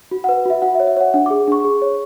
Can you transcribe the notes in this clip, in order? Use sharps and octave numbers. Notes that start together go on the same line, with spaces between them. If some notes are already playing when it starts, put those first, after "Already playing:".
F#4
B4 F#5
F#4 E5
F#4 F#5
E5
C#5
E5
C#5 F#5
D4 F#5
G#4 D6
D4 C#6
G#4
C#5